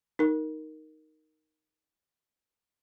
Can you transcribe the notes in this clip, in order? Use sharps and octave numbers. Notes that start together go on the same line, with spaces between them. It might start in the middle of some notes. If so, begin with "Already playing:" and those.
D#4 A#4